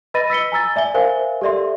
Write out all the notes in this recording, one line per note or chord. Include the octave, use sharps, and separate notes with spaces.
B4 D#5 B5 A6 A#6 D#7
E6 B6 C#7 G7
G#5 A#5 E6 A6
D5 E5 G#5 G7
A#4 C5 E5 F5 G#5
G4 A4 D5 E5 C6